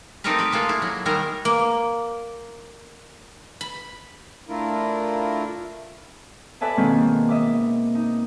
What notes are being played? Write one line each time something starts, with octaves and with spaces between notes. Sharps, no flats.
A3 C4 D#4 G4 A#4 B4
G4 B4
G#3 A#3 F4 A4
E4
F#3
D#3 G3 G#3 A#4
A#3
B5
A3 D4 E4 F4 A#4
A4 B4 D5 E5 G#5 A5
B2 D#3 G#3 A#3 C4 C#4
D#5 E5 D6
D#4